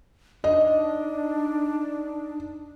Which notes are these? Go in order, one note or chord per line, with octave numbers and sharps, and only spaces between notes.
D4 D#4 D#5